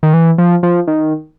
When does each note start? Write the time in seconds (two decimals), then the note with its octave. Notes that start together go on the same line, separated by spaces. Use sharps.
0.03 D#3
0.14 E3
0.38 F3
0.63 F3
0.87 D#3